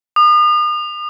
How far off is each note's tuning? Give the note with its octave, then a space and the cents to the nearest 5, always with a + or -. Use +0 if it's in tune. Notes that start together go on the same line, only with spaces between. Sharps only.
D#6 -40